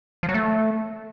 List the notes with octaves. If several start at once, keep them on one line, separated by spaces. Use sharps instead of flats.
F3
F#3
A3